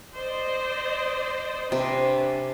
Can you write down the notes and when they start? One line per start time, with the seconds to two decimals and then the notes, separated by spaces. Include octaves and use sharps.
0.15 C5 D5 D#5
1.72 C3 C#4 D4 B4